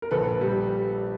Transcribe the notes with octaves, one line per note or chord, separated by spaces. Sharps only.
A#4
A#1 A4 B4
G3